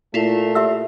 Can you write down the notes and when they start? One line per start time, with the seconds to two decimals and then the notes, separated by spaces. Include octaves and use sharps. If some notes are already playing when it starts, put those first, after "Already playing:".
0.14 A#2 A3 E4 F4
0.55 G4 E5 E6